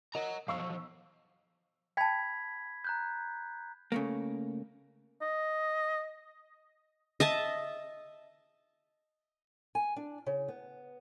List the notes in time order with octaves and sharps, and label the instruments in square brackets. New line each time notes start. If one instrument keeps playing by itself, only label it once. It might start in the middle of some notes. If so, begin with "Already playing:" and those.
[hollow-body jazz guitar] A#4 D#5 [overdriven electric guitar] F#5 A#5
[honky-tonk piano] B1 C#6 E6 [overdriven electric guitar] F3 F#3 [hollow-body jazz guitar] F5
[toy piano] G5 A5 [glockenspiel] B5 G#6 B6
[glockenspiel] A#5 F#6 G6
[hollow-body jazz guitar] C#3 A3 A#3
[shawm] D#5
[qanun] D#5 E5 A5
[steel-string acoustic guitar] G#5
D4
C#3
B3